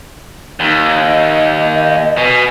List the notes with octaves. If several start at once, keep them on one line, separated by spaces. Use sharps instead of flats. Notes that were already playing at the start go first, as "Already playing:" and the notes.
D#2 D#4
D#5
B2 G#5